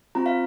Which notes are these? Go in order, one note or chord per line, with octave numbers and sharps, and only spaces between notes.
C4 F4 A#5
F5